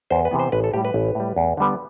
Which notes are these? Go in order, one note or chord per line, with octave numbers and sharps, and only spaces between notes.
E2 C5
B4
C3 E3 B3
C5
A1 B4
A4
A2 G3 G4
B4
A1
A2 G3
E2
D3 G3 B3